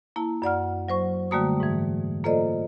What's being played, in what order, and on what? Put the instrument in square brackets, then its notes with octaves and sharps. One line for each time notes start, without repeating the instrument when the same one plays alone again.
[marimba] A#3 E4 A5
F#2 D5 F#5 F6
F#3 C5 C#6
D3 G3 A3 A#3 F#4 D#6
G#2 E3
A#3 F4 A4 C5 D5 D#5